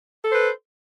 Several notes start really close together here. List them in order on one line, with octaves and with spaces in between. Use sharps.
A4 C5 B4